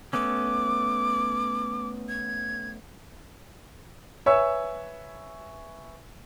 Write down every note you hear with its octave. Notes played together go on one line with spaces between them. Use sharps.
A3 B3 C#4 D6
G#6
B4 C#5 E5 G#5 C#6 E6